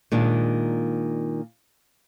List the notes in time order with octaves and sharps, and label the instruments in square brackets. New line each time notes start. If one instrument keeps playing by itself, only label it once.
[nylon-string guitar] A#2 D#3 G#3 D4